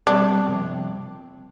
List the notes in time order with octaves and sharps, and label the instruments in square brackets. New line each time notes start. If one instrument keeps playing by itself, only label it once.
[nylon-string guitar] B2 G3 C4 [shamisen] D4
[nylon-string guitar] C3 F3 A#3